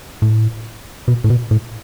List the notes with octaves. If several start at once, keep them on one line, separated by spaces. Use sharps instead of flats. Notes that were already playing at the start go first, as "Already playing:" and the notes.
A2
B2
A2
B2
A2